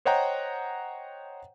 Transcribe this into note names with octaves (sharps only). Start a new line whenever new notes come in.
C5 C#5 D#5 F#5 G5 A#5